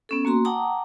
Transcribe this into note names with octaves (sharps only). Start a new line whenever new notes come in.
B3 C#4 A4
A#3 F#4 A#5 C6
F#5 G5 A5 A#5 D6 D#6